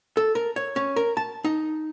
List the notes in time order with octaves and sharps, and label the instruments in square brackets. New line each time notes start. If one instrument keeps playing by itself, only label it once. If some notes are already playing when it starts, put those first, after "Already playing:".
[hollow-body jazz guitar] A4
A#4
C#5
C#4
A#4
A5
D#4